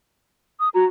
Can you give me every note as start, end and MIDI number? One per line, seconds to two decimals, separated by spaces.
0.60 0.69 87
0.74 0.84 66
0.74 0.85 82